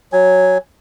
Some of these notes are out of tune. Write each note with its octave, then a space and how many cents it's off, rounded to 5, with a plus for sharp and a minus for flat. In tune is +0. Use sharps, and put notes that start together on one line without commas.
F#3 +0 G#5 +0